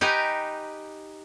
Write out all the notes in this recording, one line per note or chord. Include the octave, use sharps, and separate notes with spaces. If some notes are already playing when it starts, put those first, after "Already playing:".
D#4 G4 B4 G#5 A#5